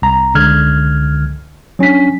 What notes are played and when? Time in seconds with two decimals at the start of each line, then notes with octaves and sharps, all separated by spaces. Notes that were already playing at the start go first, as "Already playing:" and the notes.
0.02 C2 A#5
0.35 C#2 D3 F6 G#6
1.79 F#3 C#4 D4 B6